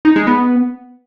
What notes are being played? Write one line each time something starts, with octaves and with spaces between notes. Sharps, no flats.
D#4
G#3
B3